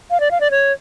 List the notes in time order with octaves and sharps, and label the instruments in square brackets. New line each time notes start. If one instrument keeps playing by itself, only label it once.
[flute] F5
D5
F5
D5
C#5